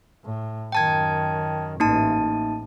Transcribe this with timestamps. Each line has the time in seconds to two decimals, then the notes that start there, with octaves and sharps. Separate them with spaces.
0.24 A2
0.72 F#2 D#3 G5 A5 G#6
1.80 A1 G#2 A#3 D#4 A5
2.17 A2